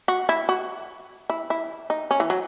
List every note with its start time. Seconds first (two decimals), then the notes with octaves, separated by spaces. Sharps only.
0.08 F#4
0.29 E4
0.49 F#4
1.30 E4
1.50 E4
1.90 D#4
2.11 C#4
2.20 E3
2.30 F#3